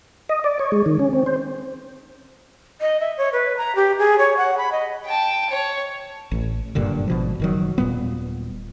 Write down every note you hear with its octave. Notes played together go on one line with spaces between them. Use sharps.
D#5
D5
C#5
G#3
D#3
C#4
C4
C5
D#5
E5
C#5
B4
A#5
G4
G#4
C#5
F#5
B5
D#5
G5 A5
C#5
A1
F#1 G2 A#2 D3
G#1 B2 F3
F#1 D#3 F#3
D#1 A#2 G3 B3